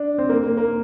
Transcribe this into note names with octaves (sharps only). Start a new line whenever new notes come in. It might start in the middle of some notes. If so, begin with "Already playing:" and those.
Already playing: D4
C4
A#3
A#3
A#3